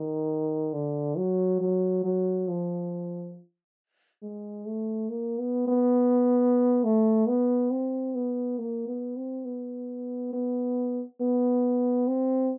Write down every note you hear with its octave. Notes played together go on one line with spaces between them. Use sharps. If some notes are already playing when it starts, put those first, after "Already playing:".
Already playing: D#3
D3
F#3
F#3
F#3
F3
G#3
A3
A#3
B3
B3
A3
B3
C4
B3
A#3
B3
C4
B3
B3
B3
C4